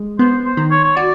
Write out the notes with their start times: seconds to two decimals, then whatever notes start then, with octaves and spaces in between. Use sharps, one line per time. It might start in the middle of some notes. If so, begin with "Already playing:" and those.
Already playing: G#3
0.19 B3 C5
0.45 C5
0.57 D#3
0.71 C#5
0.84 C#5
0.96 F#4 D5